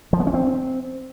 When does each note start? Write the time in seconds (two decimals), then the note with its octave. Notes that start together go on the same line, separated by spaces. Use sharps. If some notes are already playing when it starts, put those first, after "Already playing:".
0.13 F3
0.20 B3
0.27 C#4
0.34 C4